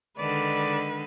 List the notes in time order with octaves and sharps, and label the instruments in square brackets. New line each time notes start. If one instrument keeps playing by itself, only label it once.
[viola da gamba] D3 D#3 G#3 [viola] B4 [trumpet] D5